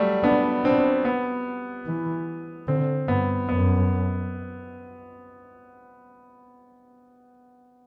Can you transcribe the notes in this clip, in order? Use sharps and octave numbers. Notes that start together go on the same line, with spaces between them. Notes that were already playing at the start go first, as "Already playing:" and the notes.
Already playing: F#3 G3 A3
B3 D4
C4 D4
B3
E3
D3 C4
G2 B3
F#2 B3